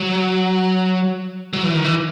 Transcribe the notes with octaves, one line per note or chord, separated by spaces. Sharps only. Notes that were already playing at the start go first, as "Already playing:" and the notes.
Already playing: F#3
F#3
E3
D#3
E3